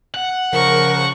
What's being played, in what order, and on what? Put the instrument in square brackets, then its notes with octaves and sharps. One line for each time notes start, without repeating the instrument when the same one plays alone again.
[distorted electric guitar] F#5
[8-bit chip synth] C#3 F3 [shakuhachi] A#4 [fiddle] C#6